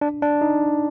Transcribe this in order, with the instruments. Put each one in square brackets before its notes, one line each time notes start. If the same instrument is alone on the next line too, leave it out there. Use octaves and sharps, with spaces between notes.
[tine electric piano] D4
D4
D#4